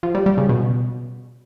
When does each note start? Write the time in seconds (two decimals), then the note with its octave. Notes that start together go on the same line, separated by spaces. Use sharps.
0.03 F3
0.15 G3
0.26 G3
0.38 C#3
0.49 B2